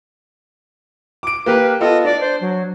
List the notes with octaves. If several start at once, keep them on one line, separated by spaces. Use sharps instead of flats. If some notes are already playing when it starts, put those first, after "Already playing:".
D6 D7
A#3 G4 A#4 B4
B3 F4 A4 D#5
D4 D5
C5
F#3